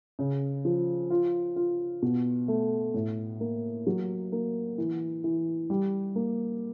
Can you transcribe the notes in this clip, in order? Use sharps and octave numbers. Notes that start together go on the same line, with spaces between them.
C#3
F3
F4
F4
B2
A3
A2
A#3
F#3
A#3
E3
E3
G3
A#3